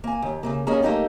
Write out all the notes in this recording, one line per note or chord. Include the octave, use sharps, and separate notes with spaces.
A#3 G#5
D#2
C#3 E3 A#3
A#3 B3 C#4 G#4 D#5
A3 A#3 C4 D#4 G4